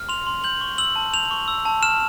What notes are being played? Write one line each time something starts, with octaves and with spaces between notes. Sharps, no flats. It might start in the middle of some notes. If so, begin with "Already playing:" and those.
Already playing: F6
C6 F7
C6
G6 F#7
C#6
E6 F#7
A5
G6 F7
C#6
E6
A5
F6 E7